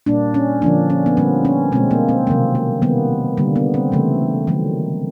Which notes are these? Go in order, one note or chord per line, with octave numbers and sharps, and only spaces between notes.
A#2 G3 A#3 D4
C#4
D3 F3 A#3 D4
C#4
B3
D3 G3 A#3 C4
C#4
B2 G#3 C4
A#3
C4
C3 D#3 F#3 A#3
A#3
D#3 G3 A#3 B3
D3 G3 A#3
B3
C4
C#3 E3 A3
D#3 F#3 A3